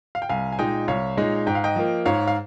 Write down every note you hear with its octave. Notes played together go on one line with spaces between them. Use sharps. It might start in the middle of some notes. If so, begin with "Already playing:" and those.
F5
G5
C2 F5 G#5
G#5
A#2 G#3 D#4 D#5 G5
C2 C#5 F5
A#2 G#3 D#4
G#2 G5
F5
D#5 G5
F3 A#3
G#2 C#5 F5
F5